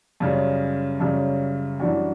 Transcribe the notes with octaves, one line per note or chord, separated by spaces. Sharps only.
F#2 C#3 G3 C#4
F#2 C#3 G3 C#4
F#2 E3 G3 D4 F#4